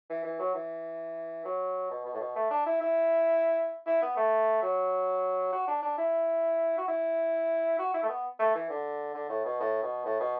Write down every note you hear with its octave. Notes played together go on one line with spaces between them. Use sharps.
E3
E3
F#3
E3
F#3
B2
B2
A2
B2
A3
D4
E4
E4
E4
B3
A3
F#3
F#4
D4
D4
E4
F#4
E4
F#4
E4
A3
B3
A3
E3
D3
D3
A2
B2
A2
B2
A2
B2